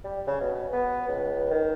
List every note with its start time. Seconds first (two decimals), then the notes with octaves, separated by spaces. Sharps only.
0.04 G3
0.27 C#3
0.40 B2
0.73 B3
1.08 C#2
1.51 D#3